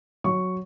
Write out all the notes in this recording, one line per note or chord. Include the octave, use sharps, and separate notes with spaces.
F#3 C#6